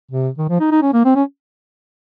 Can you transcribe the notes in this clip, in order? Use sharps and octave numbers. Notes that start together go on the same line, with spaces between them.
C3
D#3
F3
D#4
D#4
C#4
A#3
C4
C#4